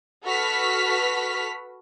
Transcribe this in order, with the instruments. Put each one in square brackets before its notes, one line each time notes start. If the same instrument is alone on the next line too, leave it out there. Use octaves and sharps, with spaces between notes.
[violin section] F#4 A4 B4 F6 B6